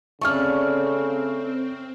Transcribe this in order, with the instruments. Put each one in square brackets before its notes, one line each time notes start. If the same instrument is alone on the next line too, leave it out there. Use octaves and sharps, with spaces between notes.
[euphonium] C#3 [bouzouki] A3 A4 D5 [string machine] C4 [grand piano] C#6 F6